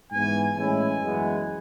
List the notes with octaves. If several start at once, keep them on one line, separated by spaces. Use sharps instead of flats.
G#2 E3 B3 G#5
A2 E3 G#3 C#4 E4 G#5
F#2 E3 G#3 B3